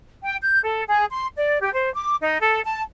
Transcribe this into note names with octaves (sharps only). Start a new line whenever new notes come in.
G5
G6
A4
G#4
C6
D5
G4
C5
D6
D#4
A4
A5